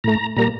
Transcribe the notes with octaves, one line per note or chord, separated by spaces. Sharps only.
A2 A3 A#5
A#2 G3 A#3 A#5